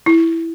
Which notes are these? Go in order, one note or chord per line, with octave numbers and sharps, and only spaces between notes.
E4